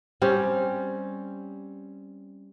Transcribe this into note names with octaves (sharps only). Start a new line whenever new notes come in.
G3 C4 C#4